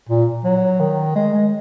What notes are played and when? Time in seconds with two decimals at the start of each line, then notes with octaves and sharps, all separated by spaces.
0.09 A#2
0.45 F#3
0.80 D#3
1.16 G#3
1.34 G#3